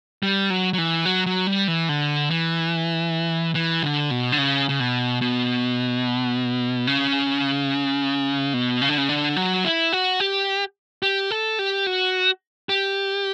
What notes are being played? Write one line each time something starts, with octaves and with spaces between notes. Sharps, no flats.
G3
F#3
F#3
E3
F#3
F#3
G3
E3
D3
E3
E3
D3
B2
D3
C#3
C#3
B2
B2
C#3
B2
C#3
D3
C#3
D3
F#3
E4
F#4
G4
G4
A4
G4
F#4
G4